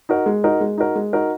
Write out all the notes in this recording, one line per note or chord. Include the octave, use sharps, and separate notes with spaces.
D#4 F#4 A#4
G#3
D#4 F#4 A#4
G#3
D#4 F#4 A#4
G#3
D#4 F#4 A#4